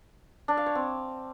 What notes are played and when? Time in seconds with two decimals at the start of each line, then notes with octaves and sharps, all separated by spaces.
0.48 D4
0.57 F5
0.66 C#5
0.75 C4